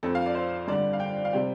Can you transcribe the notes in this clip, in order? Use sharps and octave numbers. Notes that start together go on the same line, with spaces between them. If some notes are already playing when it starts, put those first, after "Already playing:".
F2 F3 C4 A4
F5
D5
C5
G2 D3 G3 D5
F5
G5
F5
C3 G3 C4 G5